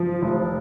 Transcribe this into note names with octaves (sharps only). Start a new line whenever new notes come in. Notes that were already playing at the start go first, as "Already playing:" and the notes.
Already playing: F3
F1